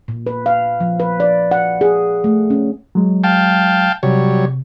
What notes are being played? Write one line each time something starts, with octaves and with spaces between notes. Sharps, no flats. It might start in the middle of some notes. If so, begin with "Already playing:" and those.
A#2
B4
F5
F3
B4
D5
F#5
G#4
A3
C#4
F#3 G#3
F5 G5 A5
C3 F#3 G3 C#5